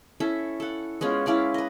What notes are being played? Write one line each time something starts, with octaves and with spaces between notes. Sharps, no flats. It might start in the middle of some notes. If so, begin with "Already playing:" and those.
C#4 E4 A4 E5
A4 F#5
G#3 B3 C#4 F4
C#4 E4 D5 F5
B4 D#5